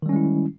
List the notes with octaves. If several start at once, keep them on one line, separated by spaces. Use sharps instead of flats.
D#3 G3 G#3 C#4 E4